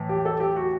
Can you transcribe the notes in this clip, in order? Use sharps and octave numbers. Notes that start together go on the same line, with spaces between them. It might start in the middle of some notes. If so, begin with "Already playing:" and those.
Already playing: A2 E3
G4
A4
G4
F#4